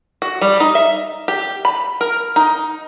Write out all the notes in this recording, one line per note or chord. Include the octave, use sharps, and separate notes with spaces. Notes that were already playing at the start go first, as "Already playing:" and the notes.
F#4
G3
D#4
E5
G4
B5
A#4
D#4